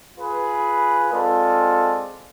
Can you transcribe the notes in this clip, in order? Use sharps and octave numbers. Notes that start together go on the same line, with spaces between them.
F4 G#4 B4
G#3 C4 F4 A4 D5